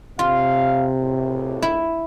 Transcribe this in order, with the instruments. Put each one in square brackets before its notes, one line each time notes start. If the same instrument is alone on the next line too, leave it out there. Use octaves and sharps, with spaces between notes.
[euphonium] C3 [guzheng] F4 [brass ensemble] F5
[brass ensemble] C#2 A2
[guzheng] E4